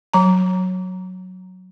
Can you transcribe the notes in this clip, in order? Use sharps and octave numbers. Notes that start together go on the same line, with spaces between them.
F#3 A#5